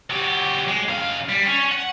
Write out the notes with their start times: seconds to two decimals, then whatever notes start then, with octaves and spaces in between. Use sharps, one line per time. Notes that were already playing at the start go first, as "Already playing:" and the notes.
0.10 F#3 G4
0.68 G#3
0.89 F#2 F5
1.30 G3
1.46 C#4
1.72 F#5